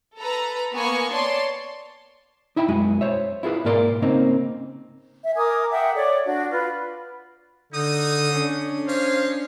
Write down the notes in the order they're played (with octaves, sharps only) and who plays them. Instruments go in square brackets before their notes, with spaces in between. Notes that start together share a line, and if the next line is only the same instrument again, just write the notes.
[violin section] A4 B4 A#5
A#3 B3 G#5 C#6
C#5 D5 A5 C6
[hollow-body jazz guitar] D#4 E4 E5 G5 A#5 B5
B1 F#2 G#3 F#4 G#5
C5 C#5 E5
E4 F4 G#4 B4
G#2 B2 A#3 A#4 D5 C6
C#3 A#3 C4 D#4
[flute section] E5
A#4 G#5 D6 D#6
E5 F#5 G5
A4 C#5 D5
D4 F#4
F4 B4
[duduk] D3 [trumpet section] D#4 D#6
[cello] C#4 D4
[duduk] C5 [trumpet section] C#5 D#5 F5